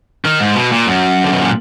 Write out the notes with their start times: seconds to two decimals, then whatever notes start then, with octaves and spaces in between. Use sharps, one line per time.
0.25 D#3
0.40 G#2
0.55 B2
0.72 A#2
0.87 F#2
1.24 D3
1.33 B2
1.41 A#2